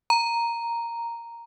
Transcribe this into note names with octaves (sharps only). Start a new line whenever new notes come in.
A#5